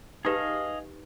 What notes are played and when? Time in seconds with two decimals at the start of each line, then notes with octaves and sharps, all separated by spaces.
0.25 D#4 G4 G#4 B4 D#5 F5